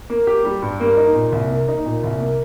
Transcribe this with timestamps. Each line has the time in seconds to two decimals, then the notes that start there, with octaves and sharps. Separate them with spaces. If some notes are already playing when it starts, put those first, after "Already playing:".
0.10 A#3
0.27 G4
0.45 G3
0.62 G2
0.80 A#3
0.97 D#4
1.15 A#2
1.32 C2
1.50 A#3
1.68 D#4
1.86 A#2
2.03 C2
2.20 A#3